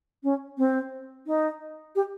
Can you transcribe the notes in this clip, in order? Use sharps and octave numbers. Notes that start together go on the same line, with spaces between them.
C#4
C4
D#4
G4